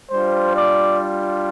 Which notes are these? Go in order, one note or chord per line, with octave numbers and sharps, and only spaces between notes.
G3 D4 F4 C5
D5